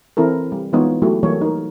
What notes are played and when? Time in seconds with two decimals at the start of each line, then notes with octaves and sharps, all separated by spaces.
0.17 E3 C4 E4 A4 A#4
0.52 G3
0.73 E3 G#3 B3 D#4 F4 C#5
1.02 F#3 A3 E4 F#4 G4
1.23 E3 F#3 G3 A#3 A4 C#5
1.41 D#4 A#4